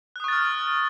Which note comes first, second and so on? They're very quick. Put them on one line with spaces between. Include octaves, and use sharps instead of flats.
F#6 D#6 C#6 A6 F6